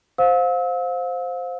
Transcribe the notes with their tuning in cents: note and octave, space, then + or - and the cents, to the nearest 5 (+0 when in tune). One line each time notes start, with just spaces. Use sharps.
C5 +0 F5 +30 E6 -35